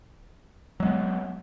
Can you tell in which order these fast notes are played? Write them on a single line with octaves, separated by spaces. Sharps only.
F#3 G#3 B3